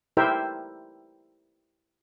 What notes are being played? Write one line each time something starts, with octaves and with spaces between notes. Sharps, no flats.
E4 G4 A#4 C5 E5 G5